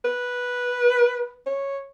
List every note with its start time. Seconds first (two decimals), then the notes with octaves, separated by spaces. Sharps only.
0.05 B4
1.46 C#5